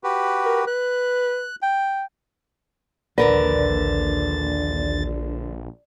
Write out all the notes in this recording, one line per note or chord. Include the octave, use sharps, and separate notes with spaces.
F#4 G4 B4
A#4
B4 F#6
G5
A#1 D#2 D3 A#4 B4 D5 A6